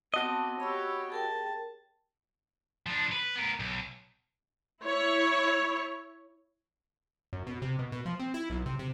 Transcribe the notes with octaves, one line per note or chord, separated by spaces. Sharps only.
B3 C4 F#4 D#5 A5 D6
G4 C#5 B5 E6
G#4 A#4 G5 A5
F3 D4
B4
B3 A#4
B1
E4 C#5
F#2
B2
C3
B2
B2
F3
C4
E4
B1
C3
C3